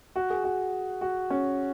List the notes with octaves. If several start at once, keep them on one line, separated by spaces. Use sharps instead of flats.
F#4
G#4
F#4
F#4
C#4